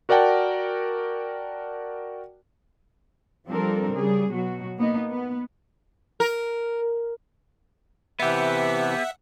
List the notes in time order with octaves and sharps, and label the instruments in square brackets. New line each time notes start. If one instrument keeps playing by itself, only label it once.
[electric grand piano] F#4 A#4 D5 F#5 G5 A5
[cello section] F3 G3 C4 D4 A4 A#4
C#3 G3 G#4
B2 F#3 F#4
A#3 B3 D#4
B3
[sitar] A#4
[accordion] C3 E3 [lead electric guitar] B3 G4 [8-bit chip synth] E5 F#5